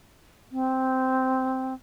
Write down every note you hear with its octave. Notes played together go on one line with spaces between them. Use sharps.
C4